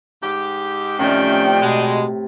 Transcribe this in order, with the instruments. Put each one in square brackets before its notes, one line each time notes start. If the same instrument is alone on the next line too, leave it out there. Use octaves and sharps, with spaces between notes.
[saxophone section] G#2 G4 [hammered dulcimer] D6
[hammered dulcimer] A2 C3 [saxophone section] D#3 F3 [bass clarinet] C#4 [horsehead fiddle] D5 G5
[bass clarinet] B2 [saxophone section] G#3